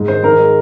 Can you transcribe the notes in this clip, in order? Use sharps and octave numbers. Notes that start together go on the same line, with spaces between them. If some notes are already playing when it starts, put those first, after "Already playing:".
Already playing: G#2
D#3 C5
D#3 A#4
G#3